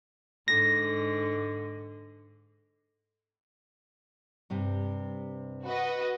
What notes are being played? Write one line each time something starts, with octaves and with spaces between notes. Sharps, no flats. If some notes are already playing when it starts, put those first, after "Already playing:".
G#2 D3 A#6
G2 C3 G3
F#4 B4 D#5